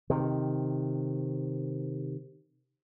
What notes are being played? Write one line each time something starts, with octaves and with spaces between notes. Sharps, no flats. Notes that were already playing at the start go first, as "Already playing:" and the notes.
C3 D#3